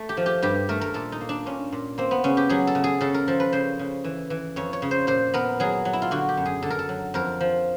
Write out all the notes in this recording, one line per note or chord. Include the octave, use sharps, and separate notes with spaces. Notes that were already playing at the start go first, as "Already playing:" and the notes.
Already playing: A3
G4
F3
G4
G2 G4
A3 A#4
A#4
A#2 A4
D#4
A#3
D4
A#2 C#4
A#2
A#3 C4
B3
C#3 C#4
G4
F#3 G#4
A4
C#3
G#4
C#3 A4
A#4
F3 A4
B4
C#3 C5
C#3
E3
E3
F2 C#5
C#5
C#3
C5
A#2 C5
B3 A#4
F#3 G#4
F#3
E4
F4
D3 F#4
G4
F#2
G#4
D3 A4
A#4
A4
F#3
F2 A#4
F3